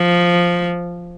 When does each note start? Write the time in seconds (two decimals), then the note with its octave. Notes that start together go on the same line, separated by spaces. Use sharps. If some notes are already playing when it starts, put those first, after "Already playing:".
Already playing: F3